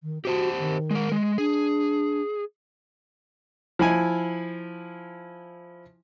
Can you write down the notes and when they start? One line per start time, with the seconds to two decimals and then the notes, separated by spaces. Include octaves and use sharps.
0.03 D#3
0.25 F#4 G4 C5 A5
0.59 D#3
0.91 G#3 A#4
1.12 G#3
1.38 D4 G#4
3.79 F3 E4 G#5